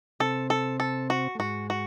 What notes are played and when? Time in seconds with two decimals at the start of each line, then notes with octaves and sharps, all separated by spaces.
0.20 C3 C4 A4
0.50 A4
0.80 A4
1.10 F#4
1.35 A3
1.39 G#2 G#3 F#4
1.70 F#4